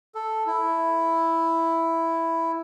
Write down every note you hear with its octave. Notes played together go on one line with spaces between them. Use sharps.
A4
E4